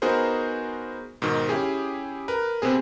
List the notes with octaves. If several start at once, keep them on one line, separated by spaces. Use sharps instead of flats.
B3 D#4 F#4 G#4 A#4 C5
G#2 B2 D#3
C#4 E4 G4 G#4
A#4 B4
C3 B3 C4 G#4